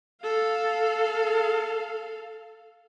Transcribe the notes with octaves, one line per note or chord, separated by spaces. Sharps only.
A4 F5